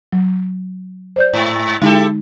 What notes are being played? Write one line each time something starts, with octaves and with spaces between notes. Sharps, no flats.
F#3
C5 D5 G6
G#2
D3 G#3 D#4 E4 G4 A4